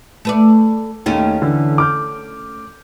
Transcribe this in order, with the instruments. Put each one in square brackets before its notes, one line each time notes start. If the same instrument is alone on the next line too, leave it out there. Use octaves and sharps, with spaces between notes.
[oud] A3 B4 D5
[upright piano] D#2 D#3 [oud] A3 C#4 G#4
[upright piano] D3 E3
D6 F6 G6